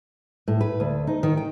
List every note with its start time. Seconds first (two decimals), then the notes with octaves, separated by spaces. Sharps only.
0.48 A2
0.61 B4
0.80 D2
1.07 D#4
1.23 D#3
1.37 G5